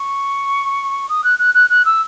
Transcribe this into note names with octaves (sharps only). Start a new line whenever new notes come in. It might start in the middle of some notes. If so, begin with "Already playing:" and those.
Already playing: C#6
D#6
F#6
F#6
F#6
F#6
E6